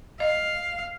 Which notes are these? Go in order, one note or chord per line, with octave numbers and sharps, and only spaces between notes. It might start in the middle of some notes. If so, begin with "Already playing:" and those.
D#5 F5